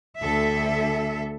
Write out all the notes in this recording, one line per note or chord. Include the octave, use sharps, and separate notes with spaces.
D2 A4 E5